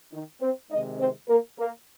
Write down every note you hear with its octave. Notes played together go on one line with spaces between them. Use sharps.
D#3 D#4
C4 C5
C3 D#3 G#3 D#4 D#5
C4 C5
A#3 A#4
A#3 A#4